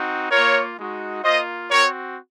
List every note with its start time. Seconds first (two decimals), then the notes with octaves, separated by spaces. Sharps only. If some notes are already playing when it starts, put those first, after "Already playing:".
Already playing: C4 D#4 F#4
0.31 A#3 F4 A#4 C#5
0.77 G#3 D#4 F#4
1.24 A#3 F4 C5 D#5
1.70 C4 F#4 A#4 C#5